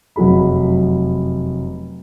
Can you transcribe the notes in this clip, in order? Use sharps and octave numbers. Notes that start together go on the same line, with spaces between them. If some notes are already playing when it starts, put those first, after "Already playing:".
F1 F#2 F#3 G#4 B5